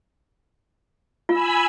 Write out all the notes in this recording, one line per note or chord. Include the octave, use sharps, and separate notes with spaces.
F4 G#5 B5 E6